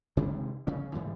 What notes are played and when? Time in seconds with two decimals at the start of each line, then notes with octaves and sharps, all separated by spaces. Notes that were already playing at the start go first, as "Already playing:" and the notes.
0.17 C3 D#3 G#3 C4
0.67 C#3 C#4
0.94 G#2 E3 G3